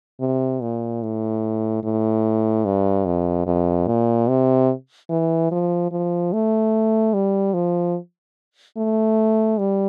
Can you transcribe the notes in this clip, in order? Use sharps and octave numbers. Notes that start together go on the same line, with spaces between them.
C3
A#2
A2
A2
G2
F2
F2
A#2
C3
E3
F3
F3
A3
G3
F3
A3
G3